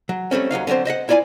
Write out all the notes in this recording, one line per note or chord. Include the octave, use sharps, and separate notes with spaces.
F#3
G3 A3 C4 C#4
D#2 F#3 D#4 F5
D3 F#3 G#3 C4 C5
C5 D#5 E5 F#5
E4 F4 D5 G5 G#5